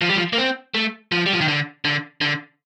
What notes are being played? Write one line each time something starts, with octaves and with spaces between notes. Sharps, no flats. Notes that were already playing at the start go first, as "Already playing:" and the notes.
F3
G3
F3
A#3
C4
A3
F3
G3
F3
D#3
D3
D3
D3